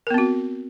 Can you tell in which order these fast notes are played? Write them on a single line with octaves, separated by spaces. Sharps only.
A#4 B3 C4 F#4